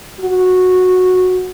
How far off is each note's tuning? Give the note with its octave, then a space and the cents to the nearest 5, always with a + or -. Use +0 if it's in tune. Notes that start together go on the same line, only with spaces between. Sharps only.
F#4 -10